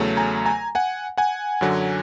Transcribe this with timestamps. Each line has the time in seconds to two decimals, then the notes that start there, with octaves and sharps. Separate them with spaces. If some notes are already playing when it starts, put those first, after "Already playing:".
Already playing: E2 C#3 F#3 A3
0.17 G#5 A#5
0.46 G#5 A#5
0.75 F#5 G#5
1.18 F#5 G#5
1.61 F#2 D3 F#3